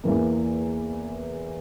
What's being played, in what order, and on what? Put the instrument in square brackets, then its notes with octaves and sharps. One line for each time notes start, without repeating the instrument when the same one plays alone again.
[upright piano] E2 E3 A#3